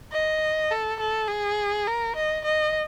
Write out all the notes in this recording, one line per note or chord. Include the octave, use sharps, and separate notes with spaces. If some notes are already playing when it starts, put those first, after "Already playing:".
D#5
A4
A4
G#4
A#4
D#5
D#5